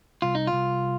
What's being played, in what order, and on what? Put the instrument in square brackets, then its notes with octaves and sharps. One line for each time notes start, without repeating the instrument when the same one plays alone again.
[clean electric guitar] C2 F4
D#4
F4
C2